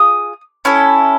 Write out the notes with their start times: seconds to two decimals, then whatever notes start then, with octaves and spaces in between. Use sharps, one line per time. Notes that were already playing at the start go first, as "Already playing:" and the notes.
Already playing: F4 G#4 D#6
0.65 C#4 E4 A4